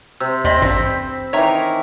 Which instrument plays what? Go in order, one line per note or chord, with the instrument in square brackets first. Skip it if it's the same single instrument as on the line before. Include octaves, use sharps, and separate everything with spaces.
[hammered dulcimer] C3 [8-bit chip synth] E6
[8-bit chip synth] D#2 D5 D#5 [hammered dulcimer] C4 B5
[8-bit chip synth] A1 G2 B6
[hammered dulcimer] D#3 E3 [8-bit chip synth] C#5 E5 A#5